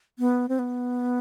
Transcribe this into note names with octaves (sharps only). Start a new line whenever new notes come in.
B3
C4
B3